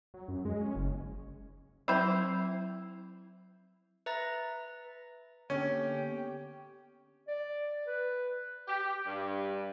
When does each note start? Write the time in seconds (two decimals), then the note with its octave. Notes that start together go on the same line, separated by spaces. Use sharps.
0.14 F#3
0.28 F#2
0.45 G#3
0.61 C#4
0.76 F#1
1.88 F#3 C4 E4 C5
4.06 B4 E5 A#5 A6 A#6
5.50 D3 A#3 B3 C#4 G4
7.28 D5
7.87 B4
8.68 G4
9.06 G2